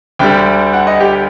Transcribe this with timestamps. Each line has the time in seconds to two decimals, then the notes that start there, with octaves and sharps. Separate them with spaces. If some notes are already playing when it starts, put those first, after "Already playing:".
0.19 D2 D3 G3 G5
0.73 F#5
0.87 D#5
1.00 G4